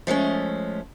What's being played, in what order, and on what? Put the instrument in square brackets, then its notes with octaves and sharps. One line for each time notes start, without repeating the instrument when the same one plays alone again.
[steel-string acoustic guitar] F3 G#3 A3 C#4